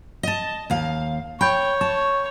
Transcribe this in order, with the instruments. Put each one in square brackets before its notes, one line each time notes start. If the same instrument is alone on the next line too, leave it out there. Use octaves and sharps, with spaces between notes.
[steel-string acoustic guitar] D#5 A5
D#2 F5
[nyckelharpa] C#5 [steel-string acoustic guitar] G5 [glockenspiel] B5 G6
[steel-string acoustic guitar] A5 [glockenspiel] C#6